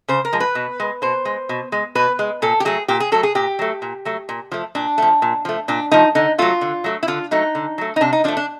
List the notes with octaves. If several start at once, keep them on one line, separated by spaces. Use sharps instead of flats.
C#3 C5
A#4
F3 G#3
B4
B2
G#3
B2 C5
G#3
B2
G#3
B2 B4
G#3
A#2 A4
G4
F#3 A3 G#4
A#2 G4
G#4
F#3 A3 A4
G#4
A#2 G4
F#3 A3
A#2
F#3 A3
A#2
F3 A3
A#2 D4
F3 A3
A#2
F3 A3
A#2 D4
F3 A3 D#4
D3 D#4
F#3 A3 F4
D3
F#3 A3
E4
D3 F4
F#3 A3 D#4
D3
F#3 A3
D#4
C3 D4
D#4
F3 A3 D4
D4